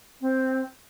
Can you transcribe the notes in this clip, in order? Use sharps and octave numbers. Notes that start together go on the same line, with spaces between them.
C4